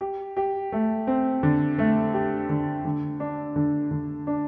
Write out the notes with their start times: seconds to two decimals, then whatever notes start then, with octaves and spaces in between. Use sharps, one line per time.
0.01 G4
0.37 G4
0.72 A3
1.07 C4
1.43 D3
1.78 A3
2.14 G4
2.49 D3
2.85 D3
3.20 D4
3.56 D3
3.91 D3
4.27 D4